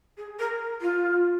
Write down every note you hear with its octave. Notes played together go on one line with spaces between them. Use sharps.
G#4
A#4
F4